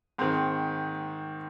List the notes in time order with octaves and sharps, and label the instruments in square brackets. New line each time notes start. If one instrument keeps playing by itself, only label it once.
[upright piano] G#2 D#3 C4